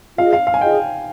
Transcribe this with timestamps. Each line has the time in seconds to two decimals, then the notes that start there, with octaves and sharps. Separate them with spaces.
0.18 F4 G#4 D#5 F5
0.33 F5
0.47 F5
0.54 G#5
0.61 F4 G#4 D#5 G5